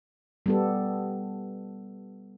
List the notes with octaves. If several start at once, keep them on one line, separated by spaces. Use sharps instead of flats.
G3 B3 A4